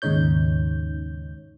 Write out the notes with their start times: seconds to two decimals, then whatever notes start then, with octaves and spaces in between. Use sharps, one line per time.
0.02 D#2 G#2 C#3 D#4 C#5 G6